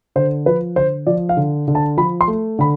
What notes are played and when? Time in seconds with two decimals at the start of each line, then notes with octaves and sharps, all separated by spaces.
0.16 D3 C5
0.46 F3 B4
0.76 D3 C5
1.06 F3 D5
1.29 F5
1.37 D3
1.68 D3
1.75 A5
1.97 F3 B5
2.21 C6
2.28 A3
2.59 D3 B5